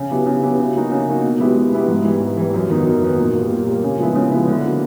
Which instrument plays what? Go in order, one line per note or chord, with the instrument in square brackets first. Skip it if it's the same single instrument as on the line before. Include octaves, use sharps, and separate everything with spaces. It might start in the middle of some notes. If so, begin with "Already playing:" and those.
Already playing: [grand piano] C#3
F#3 B3 E4 G4
C#3
F#3 B3 E4 G4
C#3
F#3 A#3 D#4 F#4
C#3
F#3 A#3 D#4 F#4
B2
G#3 B3 E4 G4
B2
G#3 B3 E4 G4
G#2
E3 G3
G#2
E3 G3
F#2
D#3 F#3 B3 D#4
F#2
D#3 F#3 B3 D#4
A#2
G3 A#3
A#2
G3 A#3
C#3
F3 G#3 B3 E4
C#3
F3 G#3 B3 E4
D3
F#3 A#3